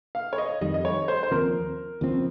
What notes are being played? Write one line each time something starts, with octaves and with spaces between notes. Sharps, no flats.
F5
C#5
D#5
F2 D#3 G3 D#5
D#5
C#5
C5
C5
D#2 C#3 F3 C4 A#4
D#2 C#3 F3 C4